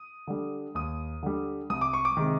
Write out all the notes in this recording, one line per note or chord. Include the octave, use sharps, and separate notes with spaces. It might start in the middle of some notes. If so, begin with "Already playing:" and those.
Already playing: D#6
D3 G3
D#2 D#6
D3 G3
C2 D#6
D6
C#6
D6
C3 D#3 G#3